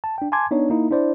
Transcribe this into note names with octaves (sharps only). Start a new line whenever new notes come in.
A5
D4 G5
G#5 A5 C6 D6 G#6
B3 D4 D#4 C#5
A#3 D#4 E4
D4 E4 C5 D5